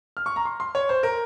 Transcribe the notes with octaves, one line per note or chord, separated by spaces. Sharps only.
F6
C#6
A#5
C6
C6
C#5
C5
A#4